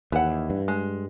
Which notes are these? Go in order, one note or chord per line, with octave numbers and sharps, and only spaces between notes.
D#2 E3 F#5
G2
G#3